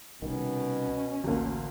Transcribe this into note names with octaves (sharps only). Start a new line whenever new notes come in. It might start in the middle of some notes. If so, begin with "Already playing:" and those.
C2 B2 D#3 C#4
A1 D2 A#3